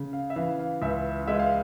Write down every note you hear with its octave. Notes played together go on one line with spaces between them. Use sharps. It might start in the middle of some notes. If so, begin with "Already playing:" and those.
Already playing: C#3
F5
E5
E3 F5
F5
C#2 E5
G#3 E5
F5